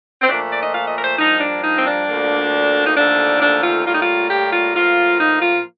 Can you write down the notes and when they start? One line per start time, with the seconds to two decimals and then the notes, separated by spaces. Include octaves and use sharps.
0.21 C4
0.29 A#2 F3 A3 D4
0.52 D5
0.62 D#5
0.74 F5
0.88 D#5
0.97 A#4
1.03 C5
1.18 G2 F3 A#3 D#4
1.40 D4
1.63 D#4
1.76 C4
1.85 D4
2.07 D2 D3 F3 A#3
2.86 D#4
2.97 D#2 D3 F3 A3 D4
3.41 D4
3.63 F4
3.85 A2 G3 A#3 F4
3.94 D#4
4.02 F4
4.30 G4
4.53 F4
4.75 A2 F3 A#3 F4
5.20 D#4
5.42 F4